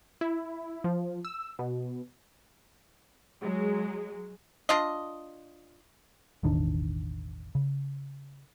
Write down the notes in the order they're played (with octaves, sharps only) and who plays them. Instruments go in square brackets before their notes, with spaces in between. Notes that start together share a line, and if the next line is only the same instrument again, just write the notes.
[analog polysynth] E4
F3
E6
B2
[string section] F#3 G#3
[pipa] D4 F4 D#5
[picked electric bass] E1 A1 D#3 D4
C#3